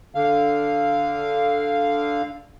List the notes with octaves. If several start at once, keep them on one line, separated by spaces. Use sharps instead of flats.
D3 F5